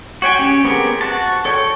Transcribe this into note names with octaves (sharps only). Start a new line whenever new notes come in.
F#4 C#5 G5 G#5
C#4 G4
B3 C4 G4 G#4 A#4
F#4 A5
A4 C#5 G5